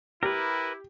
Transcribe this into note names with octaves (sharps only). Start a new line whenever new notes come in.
E4 G4 A#4 B4